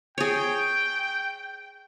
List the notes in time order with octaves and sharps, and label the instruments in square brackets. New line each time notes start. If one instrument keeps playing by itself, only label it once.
[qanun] G#4 C#5 [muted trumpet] G5